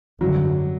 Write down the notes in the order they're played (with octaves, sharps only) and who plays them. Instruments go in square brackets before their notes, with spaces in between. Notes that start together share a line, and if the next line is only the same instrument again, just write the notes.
[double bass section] G#1 F#2 D3 G3 [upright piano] F#3